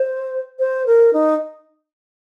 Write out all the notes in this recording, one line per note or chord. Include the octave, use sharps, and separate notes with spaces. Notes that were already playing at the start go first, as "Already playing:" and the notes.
Already playing: C5
C5
A#4
D#4